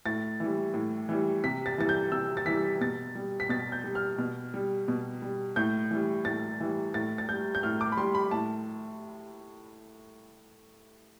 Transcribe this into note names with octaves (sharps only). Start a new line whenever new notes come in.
A2 A6
E3 G3
A2
E3 G3
C3 B6
A6
E3 G3 A6
G6
C3 E6
A6
E3 G3 B6
B2 A6
G3
B6
B2 A6
G6
G3
F6
B2
G3
B2
G3
A2 G6
E3 G3
A2 A6
E3 G3
A2 A6
A6
G3 G6
G6
A2 F6
D6
B5
G3 C6
B5
A2 A5